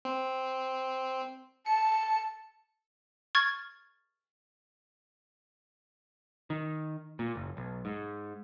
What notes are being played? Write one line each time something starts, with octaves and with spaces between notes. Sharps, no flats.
C4
A5 C#7
C#6 F6 G#6 A6
D#3
A#2
F#1
B1
G#2